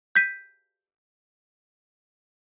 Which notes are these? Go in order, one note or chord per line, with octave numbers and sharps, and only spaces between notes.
G6 B6 D#7